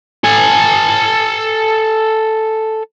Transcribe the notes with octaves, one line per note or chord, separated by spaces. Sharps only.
A4 G#5